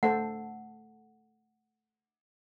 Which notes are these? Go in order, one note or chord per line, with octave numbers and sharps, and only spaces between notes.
A3 A4 C5 F#5